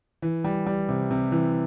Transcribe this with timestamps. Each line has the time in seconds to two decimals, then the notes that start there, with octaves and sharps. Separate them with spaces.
0.22 E3
0.44 G3
0.66 G3
0.89 C3
1.11 C3
1.32 E3